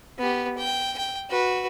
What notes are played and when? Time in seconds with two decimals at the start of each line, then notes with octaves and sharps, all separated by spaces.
0.19 B3 G4
0.58 G5
0.98 G5
1.30 F#4 B4